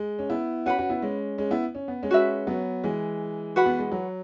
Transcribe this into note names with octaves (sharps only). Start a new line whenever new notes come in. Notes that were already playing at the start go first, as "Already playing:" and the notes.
Already playing: G#3
C#4
B3 E4
C#4 F#4 B4 F#5 B5
C#4 F#4
B3 E4
G#3 C#4
G#3 C#4
B3 E4
C#4
B3
G#3 C#4
F#4 B4 E5
F#3 B3
E3 G#3
F#4 B4 F#5 B5
B3
G#3
F#3